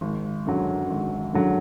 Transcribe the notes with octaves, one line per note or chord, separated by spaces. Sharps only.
G#1
F#2 D3 F#3
G#1
F#2 D3 F#3